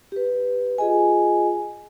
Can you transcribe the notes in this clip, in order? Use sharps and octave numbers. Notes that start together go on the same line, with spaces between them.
G4 B4
F4 G#4 D#5 G#5